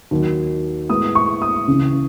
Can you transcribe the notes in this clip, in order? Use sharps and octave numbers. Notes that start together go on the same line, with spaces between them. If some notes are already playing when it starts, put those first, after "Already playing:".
D#2 D#3 F#3
A2 G#3 B3 D#6
C#6
D#6
C#2 C#3 E3